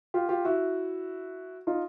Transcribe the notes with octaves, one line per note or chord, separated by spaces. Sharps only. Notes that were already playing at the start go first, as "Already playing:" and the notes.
F4 G4
F4 G4
E4 F#4
D#4 F4